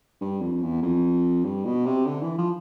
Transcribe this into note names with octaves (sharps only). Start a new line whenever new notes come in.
G2
F2
E2
F2
G2
B2
C3
D3
E3
F3